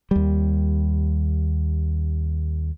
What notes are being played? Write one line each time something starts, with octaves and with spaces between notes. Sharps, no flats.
D#2 G3